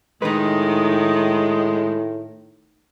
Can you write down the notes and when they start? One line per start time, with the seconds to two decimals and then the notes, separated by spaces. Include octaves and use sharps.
0.22 A2 D#3 G#3 D#4 B4